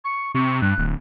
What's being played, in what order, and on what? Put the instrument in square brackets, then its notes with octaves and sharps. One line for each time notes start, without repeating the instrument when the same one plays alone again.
[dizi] C#6
[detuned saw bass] C3 [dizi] C#6
[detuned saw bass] G2 [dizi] F#6
[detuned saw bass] D1